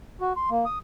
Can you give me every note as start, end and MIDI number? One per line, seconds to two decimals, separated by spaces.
0.21 0.33 66
0.37 0.50 84
0.51 0.65 58
0.65 0.78 87